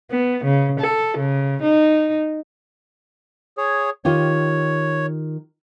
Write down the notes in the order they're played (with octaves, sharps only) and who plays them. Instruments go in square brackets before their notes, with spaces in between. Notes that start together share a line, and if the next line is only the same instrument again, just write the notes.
[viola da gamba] B3
C#3
A4
C#3
D#4
[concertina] G#4 C#5
[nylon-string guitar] D#3 F4 G4 [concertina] C#5